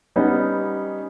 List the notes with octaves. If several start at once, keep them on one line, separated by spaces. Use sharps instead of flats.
G3 B3 C#4 D#4